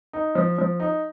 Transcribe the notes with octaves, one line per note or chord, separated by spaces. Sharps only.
D#4
F3
F3
D#4